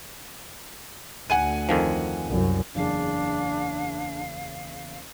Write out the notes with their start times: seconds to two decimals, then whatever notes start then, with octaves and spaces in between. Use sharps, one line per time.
1.30 D2 F#5 G#5 D#7
1.69 F2 D#3 F3
2.27 C2 F#2
2.75 F#1 E2 D4 G#4 F5